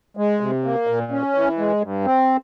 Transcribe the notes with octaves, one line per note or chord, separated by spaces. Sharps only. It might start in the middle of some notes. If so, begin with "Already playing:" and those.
G#3
C3
A#3
A#2
C#4
E3
G#3
G2
C4